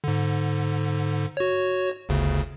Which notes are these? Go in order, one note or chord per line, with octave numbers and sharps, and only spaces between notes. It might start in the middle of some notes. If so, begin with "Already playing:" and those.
G#2 D3
F#4 C#5
G1 D2 C#3